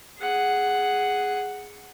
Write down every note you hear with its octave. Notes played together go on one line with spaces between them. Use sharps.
G#4 F#5